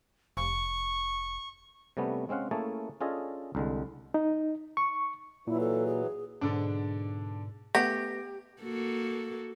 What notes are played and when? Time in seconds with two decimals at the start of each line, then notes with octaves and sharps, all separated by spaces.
0.37 F1 C#6
1.97 C3 G3 A3 B3 C#4
2.29 G#3 C4 C#4 F5 F#5
2.51 A3 A#3 C#4 E4 G#4 A5
3.01 C#4 D4 F4 G#4 A4 D#5
3.55 C2 D3 G#3
4.14 D#4
4.77 C#6
5.47 A#2 E3 F#3 E4
5.60 A4
5.86 G#4
6.41 G#2 B2 D3 D4 B6
7.75 A3 B3 G4 F#5 A#6
8.62 A#3 F#4 A4